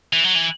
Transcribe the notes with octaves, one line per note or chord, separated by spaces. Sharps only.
E3
F#3
E3